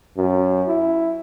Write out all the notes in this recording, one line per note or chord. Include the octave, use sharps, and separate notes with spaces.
F#2
E4